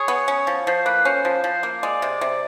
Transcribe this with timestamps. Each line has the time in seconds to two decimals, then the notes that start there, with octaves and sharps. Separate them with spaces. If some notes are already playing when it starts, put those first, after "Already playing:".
Already playing: G#4 C#5
0.08 B3
0.28 C#4
0.47 F3
0.67 F3 C5
0.86 A#3 B4
1.05 C#4 C5
1.25 F3
1.44 F3
1.63 A#3
1.82 G#3 D5
2.02 C3
2.21 C3